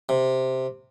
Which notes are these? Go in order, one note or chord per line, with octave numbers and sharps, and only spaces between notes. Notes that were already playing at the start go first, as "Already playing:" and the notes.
C3